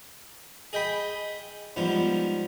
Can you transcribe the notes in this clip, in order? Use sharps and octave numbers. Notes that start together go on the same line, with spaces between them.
G#4 D#5 G5 B5
G#2 F3 G3 B3 F4